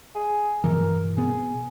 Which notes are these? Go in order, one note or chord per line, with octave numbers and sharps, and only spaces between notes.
G#4
G2 B2 E3 A#4
B2 B3 G#4